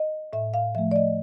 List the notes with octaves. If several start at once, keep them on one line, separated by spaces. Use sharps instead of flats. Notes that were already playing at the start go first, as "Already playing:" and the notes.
Already playing: D#5
A2 E5
F5
F3 A3 E5
D5
D#5